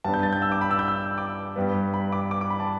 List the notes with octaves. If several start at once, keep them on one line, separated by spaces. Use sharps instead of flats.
G2 G3 B3 D4 A5
G6
A6
G6
E6
D6
B5
E6
G6
E6
D6
G2 G3 B3
B5
D6
D6
D6
B5
A5